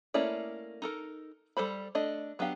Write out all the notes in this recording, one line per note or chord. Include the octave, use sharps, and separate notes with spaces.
A3 A#3 C#4 E4 D5
D#4 A4 A#4
G3 A4 C5 B5
A3 D4 D#5
F#3 B3 D4 G4 F5